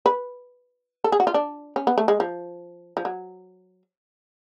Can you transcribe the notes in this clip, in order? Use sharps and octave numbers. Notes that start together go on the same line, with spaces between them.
B4
A4
G#4
F#4
F4
D4
C#4
B3
A3
G#3
F3
F3
F#3